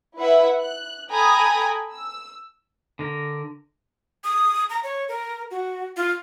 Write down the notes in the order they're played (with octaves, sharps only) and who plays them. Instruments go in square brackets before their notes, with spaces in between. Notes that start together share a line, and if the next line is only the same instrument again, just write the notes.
[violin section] E4 B4 E5 F#5
F#6
A4 G5 G#5 A#5 B5 D#6
E6
[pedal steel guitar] D3 A#4
[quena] D#6
A#5
C#5
A#4
F#4
F4